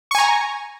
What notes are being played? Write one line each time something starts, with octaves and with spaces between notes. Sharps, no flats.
G#5 A#5 C#6